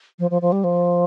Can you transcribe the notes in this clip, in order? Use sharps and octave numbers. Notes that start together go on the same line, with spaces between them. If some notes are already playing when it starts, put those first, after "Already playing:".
F3
F3
F3
G3
F3